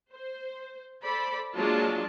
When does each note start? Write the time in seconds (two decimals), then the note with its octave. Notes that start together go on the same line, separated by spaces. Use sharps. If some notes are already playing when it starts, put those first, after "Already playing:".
0.13 C5
1.03 A4 C5 D5 B5
1.54 F#3 G#3 A#3 D4 F4 A5